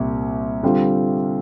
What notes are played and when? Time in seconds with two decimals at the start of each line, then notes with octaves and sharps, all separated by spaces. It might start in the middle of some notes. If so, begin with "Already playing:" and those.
Already playing: C2 A#2 C4
0.63 D3 G3 C4 F4